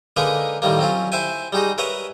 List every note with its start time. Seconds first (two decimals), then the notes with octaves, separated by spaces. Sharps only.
0.17 D3 G#3 A#3 D#4 A#4 B4
0.62 A2 D#3 G3 A#3
0.79 F#3 C4 C#4 F4
1.12 E4 C5 E5 G5 G#5
1.53 G3 G#3 D#4 F#4 G#4
1.78 A#4 B4 C#5 D#5 E5 F#5